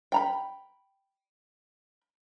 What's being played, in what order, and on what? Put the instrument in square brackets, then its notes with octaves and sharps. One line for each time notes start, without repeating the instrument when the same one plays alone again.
[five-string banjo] G5 A#5 B5